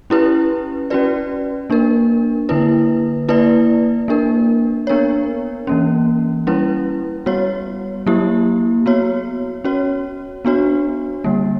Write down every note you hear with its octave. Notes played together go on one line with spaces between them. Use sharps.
C#4 E4 G4 B4
C#4 F#4 B4 D5
A#3 D4 A#4
D3 A#3 E4 B4
A#3 E4 B4 D5
A#3 D4 A#4
B3 D4 A#4 C#5
E3 A#3 C#4
G3 C#4 E4 B4
G3 B3 F#4 C#5
F#3 A#3 E4 G4
B3 F#4 C#5
C#4 F#4 C#5
B3 D4 F#4 C#5
D3 G3 A#3